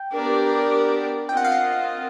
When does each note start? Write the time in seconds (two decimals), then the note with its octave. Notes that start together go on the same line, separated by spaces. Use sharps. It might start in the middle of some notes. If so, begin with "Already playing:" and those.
Already playing: G5
0.14 B3 D4 G4 A#4 D5
1.29 C4 F4 A#4 D#5 G5
1.37 F#5
1.45 F5
1.52 F#5